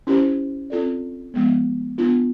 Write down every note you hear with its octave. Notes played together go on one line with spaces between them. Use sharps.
C#4 E4 G4 C5
C4 F4 A4 D5
F3 G#3 B3
B3 D4 F4